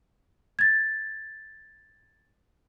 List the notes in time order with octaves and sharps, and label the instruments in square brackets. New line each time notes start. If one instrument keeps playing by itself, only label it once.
[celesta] G#6 A6